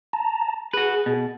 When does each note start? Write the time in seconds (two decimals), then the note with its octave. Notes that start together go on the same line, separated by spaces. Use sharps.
0.13 A5 A#5
0.73 F#4 G#4 B4
1.06 B2